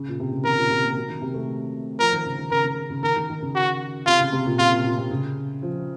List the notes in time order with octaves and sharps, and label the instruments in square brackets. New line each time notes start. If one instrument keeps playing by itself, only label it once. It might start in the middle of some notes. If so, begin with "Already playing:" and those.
Already playing: [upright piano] C#3
A#2
C3
C#3
[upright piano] D#3 [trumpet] A#4
[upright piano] A#2
C3
A#3
F#3
D#3
C3
A3
[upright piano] F3 [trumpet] A#4
[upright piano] D#3
C#3
D#3
[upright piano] C#3 [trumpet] A#4
[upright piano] C#3
C#3
[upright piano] D#3 [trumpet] A#4
[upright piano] D#3
D#3
C#3
[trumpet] F#4
[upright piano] C3 [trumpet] F4
[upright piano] C#3
C3
A#2
[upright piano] C3 [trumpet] F4
[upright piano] A#2
A#2
C3
C#3
F3